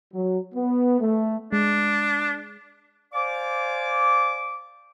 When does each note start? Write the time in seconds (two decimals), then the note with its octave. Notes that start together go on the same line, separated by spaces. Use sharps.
0.13 F#3
0.54 B3
1.00 A3
1.52 G#3 D4
3.13 C5 D5 F5 G#5 D6